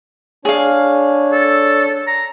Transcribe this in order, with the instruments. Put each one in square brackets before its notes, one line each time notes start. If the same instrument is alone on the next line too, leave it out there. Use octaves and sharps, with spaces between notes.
[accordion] D4 C#5 [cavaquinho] G#4 F5
[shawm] A4
A#5